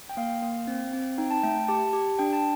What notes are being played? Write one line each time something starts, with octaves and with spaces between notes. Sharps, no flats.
G5
A#3 F5
A#3
C4
C4
D#4 G5
A5
A3 G5
G4 A5
G4
D4 G5
A5